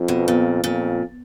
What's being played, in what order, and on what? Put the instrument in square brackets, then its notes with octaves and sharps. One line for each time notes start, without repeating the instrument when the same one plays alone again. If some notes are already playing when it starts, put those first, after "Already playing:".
Already playing: [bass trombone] F2
[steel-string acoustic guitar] B2
A#2
[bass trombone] F2 [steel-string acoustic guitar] A#2